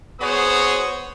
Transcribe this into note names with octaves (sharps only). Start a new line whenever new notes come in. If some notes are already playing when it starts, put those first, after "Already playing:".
B3 F#4 G#4 C5 C#5 D#6